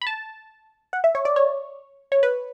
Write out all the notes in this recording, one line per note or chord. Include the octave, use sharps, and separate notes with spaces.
B5
A5
F#5
E5
C#5
D5
C#5
C#5
B4